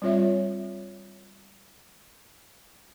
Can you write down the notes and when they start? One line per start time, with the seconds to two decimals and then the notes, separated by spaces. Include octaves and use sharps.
0.02 G3 C4 F4 C#5 E5